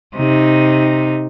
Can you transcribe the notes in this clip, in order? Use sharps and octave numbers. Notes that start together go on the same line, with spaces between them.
C3 D#4